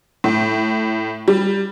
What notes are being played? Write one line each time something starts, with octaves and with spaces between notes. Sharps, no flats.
A2
G3